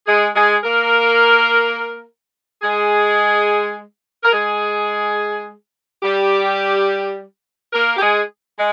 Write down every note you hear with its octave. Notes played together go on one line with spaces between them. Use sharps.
G#3 G#4
G#3 G#4
A#3 A#4
G#3 G#4
A#4
G#3 G#4
G3 G4
A#3 A#4
G4
G#3 G#4
G#3